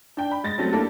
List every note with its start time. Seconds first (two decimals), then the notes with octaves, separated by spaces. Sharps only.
0.17 D4 G5
0.31 B5
0.44 G#3 A6 A#6
0.58 F#3 G3 A3 C4 C#4
0.73 A#3 D4 E4 G4 A4